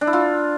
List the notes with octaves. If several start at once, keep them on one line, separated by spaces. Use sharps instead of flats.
D4
E4
F4